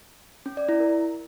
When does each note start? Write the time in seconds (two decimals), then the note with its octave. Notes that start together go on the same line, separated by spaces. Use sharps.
0.46 C#4
0.57 D5
0.69 E4
0.80 A#4